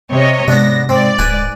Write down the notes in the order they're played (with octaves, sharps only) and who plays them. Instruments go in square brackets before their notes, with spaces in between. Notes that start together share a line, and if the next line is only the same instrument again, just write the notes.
[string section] C3 C#5 D#5
[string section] G#2 A#6 [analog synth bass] C3 [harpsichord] B3 D4
[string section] G#2 D5 [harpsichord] C4
[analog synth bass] D1 [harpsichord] B4 G#5